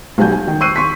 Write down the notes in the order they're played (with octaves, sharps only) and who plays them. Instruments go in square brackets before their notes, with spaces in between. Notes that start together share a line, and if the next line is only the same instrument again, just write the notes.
[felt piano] B1 G3 F#4 G#5 G6
G#5
D#3
C#6 E6 F#6 G6 C7 D#7
C6 C#6 B6